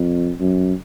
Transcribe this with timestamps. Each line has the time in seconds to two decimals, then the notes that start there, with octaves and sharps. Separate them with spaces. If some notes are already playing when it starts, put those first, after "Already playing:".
Already playing: F2
0.40 F#2